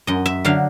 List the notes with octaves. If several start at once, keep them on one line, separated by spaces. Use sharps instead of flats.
F#2 D#5
E5
D3 F#3 F5